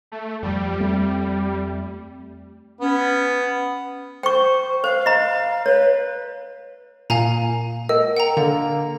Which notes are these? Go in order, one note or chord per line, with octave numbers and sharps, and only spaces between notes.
A3
F2 F3 G3
F2 A3 C4
B3 C#4
C5 G5 C#6
C5 F5
D#5 A#5
B4 C#5
A#2 F5 G#5 A#5
A#4 D#5
F#5 G5 A#5
D3 A#3